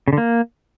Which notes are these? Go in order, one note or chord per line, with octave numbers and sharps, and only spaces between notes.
C#3
D3
A#3